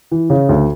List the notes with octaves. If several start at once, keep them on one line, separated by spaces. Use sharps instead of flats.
E3
C#3
D2